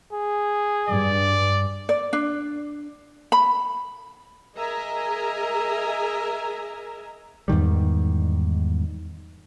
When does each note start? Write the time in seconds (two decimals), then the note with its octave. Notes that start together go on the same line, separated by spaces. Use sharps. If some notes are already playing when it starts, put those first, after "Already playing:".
0.13 G#4
0.89 G2 D5
1.89 D5
2.13 D4
3.32 B5
4.56 G#4 A#4 D#5 E5 G#5 A#5
7.48 E2 G#2 D#3 G3